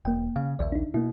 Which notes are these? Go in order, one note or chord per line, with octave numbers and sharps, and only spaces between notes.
E1 A#3 G5
C#3 F5
A#1 D#2 D5 E5
D4 D#4
B2 A#3 E4